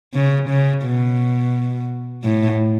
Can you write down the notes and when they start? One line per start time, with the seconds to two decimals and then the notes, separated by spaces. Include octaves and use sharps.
0.14 C#3
0.49 C#3
0.84 B2
2.24 A2